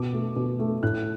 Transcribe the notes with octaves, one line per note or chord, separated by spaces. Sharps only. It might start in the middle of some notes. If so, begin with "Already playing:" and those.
Already playing: B2 D6
A3
B2
A3
A2 F#6